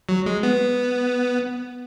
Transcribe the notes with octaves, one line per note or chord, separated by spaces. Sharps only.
F#3
G#3
B3